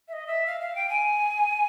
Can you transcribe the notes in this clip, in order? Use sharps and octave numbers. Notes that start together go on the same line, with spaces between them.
E5
D#5
E5
F5
F5
G5
G#5